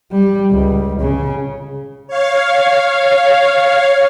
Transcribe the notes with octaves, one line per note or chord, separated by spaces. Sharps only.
G3
C#2
C#3
C#5 F5